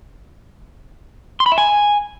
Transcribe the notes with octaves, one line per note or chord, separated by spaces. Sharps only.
C6
B5
E5
G#5